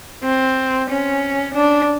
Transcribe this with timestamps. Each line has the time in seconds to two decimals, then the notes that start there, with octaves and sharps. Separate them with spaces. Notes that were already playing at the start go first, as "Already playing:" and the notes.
0.24 C4
0.89 C#4
1.54 D4